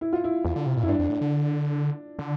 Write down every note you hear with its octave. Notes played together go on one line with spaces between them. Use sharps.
E4
F4
E4
E2
D3
C3
A#2
F2 E4
G2 D4
F2
A2
D3
D3